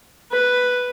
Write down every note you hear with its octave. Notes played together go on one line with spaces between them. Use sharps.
B4